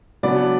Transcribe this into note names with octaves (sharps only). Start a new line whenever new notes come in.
C#3 F#3 B3 D4 D5